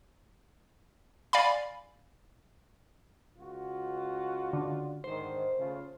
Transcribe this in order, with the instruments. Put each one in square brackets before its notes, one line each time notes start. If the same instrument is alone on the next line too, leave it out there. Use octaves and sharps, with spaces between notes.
[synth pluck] D5 F5 G#5 B5
[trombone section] C#2 F4 F#4
[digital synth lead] D3
[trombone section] G#2 D3 D#3 [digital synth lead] C5
[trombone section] C#3 A3 F4